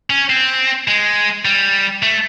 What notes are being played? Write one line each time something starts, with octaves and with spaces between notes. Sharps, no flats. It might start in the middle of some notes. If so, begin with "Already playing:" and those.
C#4
C4
G#3
G3
A3